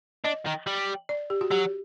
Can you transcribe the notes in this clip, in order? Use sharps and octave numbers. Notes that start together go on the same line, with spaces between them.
D4 D#5
D#3
G3
D5
G4
F#4
F#3 G4